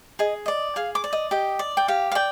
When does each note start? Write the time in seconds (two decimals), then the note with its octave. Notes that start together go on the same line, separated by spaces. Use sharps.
0.19 G#4 D#5
0.46 D5 D#5
0.76 G#4 F5
0.95 D6
1.04 D5
1.13 D#5
1.31 G4 D#5
1.59 D5
1.77 G5
1.88 G4 F5
2.12 F5
2.15 D5 G5